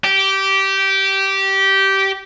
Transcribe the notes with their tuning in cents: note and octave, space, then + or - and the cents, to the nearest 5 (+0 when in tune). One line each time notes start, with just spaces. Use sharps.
G4 -15